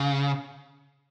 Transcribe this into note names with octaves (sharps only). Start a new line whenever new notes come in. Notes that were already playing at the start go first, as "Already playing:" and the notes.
Already playing: C#3